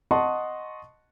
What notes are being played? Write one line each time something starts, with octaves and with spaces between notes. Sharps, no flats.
D#5 F#5 A5 C6 C#6 D#6